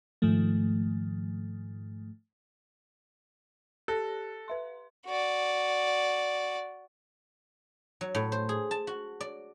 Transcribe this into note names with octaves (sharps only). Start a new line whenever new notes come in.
G#2 D#3 F3 A3
G4 A4 F#6 A#6
B4 E5 C6
F#4 D5
F#3
A2
C5
G#4
A5
F#4
D5